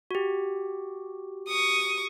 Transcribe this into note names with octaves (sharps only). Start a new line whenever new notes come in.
F#4 G4
C#6 D#6